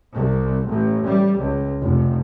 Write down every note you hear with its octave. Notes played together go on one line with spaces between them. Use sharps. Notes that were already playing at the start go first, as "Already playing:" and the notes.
C2
A1
G3
C#2
F1